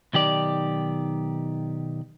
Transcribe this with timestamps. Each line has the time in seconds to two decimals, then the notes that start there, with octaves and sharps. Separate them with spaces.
0.13 B1 D#3 G4 D5